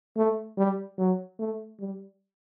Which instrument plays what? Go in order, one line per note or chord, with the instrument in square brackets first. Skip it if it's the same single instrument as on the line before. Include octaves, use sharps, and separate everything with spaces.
[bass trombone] A3
G3
F#3
A3
G3